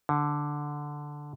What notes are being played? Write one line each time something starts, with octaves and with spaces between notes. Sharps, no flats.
D3